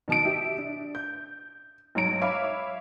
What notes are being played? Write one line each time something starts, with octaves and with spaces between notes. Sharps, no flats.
B2 D#3 A5 D#6 D7
G4 E5
D4
G6
B1 G#2 D#4 C#5 A#5 D7
C#5 E5 F5 B5 D6